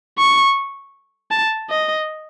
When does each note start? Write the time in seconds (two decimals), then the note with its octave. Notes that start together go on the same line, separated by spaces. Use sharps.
0.19 C#6
1.31 A5
1.70 D#5